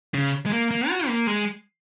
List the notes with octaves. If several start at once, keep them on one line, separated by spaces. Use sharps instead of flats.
C#3
G#3
A#3
A#3
F#4
A#3
G#3